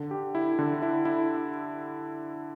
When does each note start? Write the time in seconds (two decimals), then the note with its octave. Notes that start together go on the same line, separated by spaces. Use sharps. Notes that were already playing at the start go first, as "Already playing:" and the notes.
Already playing: D3
0.11 G4
0.35 E4
0.59 D3
0.82 E4
1.05 E4